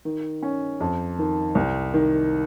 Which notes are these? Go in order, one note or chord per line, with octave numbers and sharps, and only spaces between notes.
D#3
C#4
F2
D#3
C2
D#3